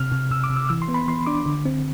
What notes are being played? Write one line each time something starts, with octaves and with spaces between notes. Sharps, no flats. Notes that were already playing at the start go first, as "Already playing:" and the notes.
Already playing: C3 F6
C3
C3 E6
D6
C3
E6
E3 E6
C6
B3
B5
E3 C6
D4 D6
D3
C4